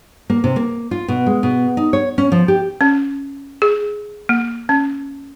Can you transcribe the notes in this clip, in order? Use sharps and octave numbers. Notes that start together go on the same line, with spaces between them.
A#3
C3
A#3
F4
B2
G#3
B2
D#4
C#5
C#4
F3
G4
C#4
G#4
A#3
C#4